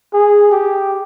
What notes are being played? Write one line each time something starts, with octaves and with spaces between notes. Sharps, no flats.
G#4
G4